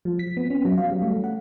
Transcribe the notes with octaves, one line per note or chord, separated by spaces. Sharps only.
F3
B6
B3
C#4
F#3
F5
G3
A3
F#5